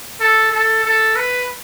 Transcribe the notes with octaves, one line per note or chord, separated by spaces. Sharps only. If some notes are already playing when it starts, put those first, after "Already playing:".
A4
A4
A4
B4